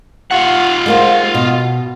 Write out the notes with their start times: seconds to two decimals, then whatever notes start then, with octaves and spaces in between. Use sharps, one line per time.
0.31 F4 F#5
0.86 G#3 A#3 C5
1.34 B2